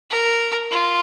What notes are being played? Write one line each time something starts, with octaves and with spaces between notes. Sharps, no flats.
A#4
F4